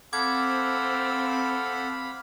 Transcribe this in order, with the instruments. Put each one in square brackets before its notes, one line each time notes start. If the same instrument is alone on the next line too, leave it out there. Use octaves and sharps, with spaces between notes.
[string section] C4 [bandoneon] A4 F#5 [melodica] F5 B5 [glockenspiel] D6 G#6